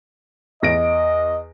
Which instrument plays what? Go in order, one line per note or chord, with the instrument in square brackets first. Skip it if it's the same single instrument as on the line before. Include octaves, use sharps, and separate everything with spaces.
[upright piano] E2 A#6 D7 [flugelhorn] D#5